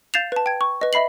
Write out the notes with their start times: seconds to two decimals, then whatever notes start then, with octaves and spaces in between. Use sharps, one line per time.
0.14 F5 G6 A6 C7 E7 F7
0.32 B4 A5
0.46 G5 G#6
0.61 C#6
0.81 B4 D#5
0.93 D#5 E5 B5 C7 F#7